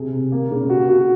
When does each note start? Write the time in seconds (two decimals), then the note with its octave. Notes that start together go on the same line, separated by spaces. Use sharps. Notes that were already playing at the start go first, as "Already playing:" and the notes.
Already playing: C3 G#4
0.12 C3
0.32 A#3
0.51 C#3
0.70 F#4
0.89 F#4